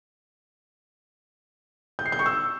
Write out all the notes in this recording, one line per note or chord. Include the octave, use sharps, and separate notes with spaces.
G6
C7
G6
C#6
E6